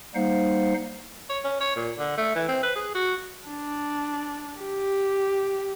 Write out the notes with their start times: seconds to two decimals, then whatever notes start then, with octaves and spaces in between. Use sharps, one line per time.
0.15 G3 A#3 D#4 C5 F5 F#5
1.30 C#5
1.44 C#4
1.60 C#5
1.76 A#2
1.98 D3
2.18 A3
2.35 E3
2.48 C4
2.63 B4
2.76 G#4
2.95 F#4
3.47 D4
4.61 G4